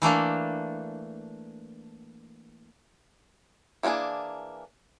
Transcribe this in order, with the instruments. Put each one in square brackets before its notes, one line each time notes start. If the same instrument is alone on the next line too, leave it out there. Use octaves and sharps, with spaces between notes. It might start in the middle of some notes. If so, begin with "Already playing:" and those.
[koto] E3 A3 A#3 D4
[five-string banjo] E3 A#3 C#4 D4 G#4